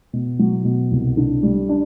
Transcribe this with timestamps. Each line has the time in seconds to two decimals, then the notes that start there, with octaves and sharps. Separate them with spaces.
0.13 B2
0.39 F#3
0.65 B2
0.91 C2
1.17 D3
1.43 G3
1.69 D4